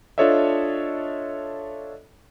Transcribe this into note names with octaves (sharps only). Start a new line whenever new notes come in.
D4 F4 A4 C#5 D#5 E5